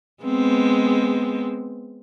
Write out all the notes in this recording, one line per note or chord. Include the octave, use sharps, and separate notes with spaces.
G#3 B3 C4